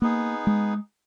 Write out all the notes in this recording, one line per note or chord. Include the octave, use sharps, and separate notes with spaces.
A#3 B3 D#4 G#4
G#3